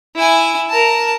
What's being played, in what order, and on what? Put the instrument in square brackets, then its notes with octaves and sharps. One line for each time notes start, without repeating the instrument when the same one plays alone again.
[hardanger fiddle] E4 G#5
A#4 A5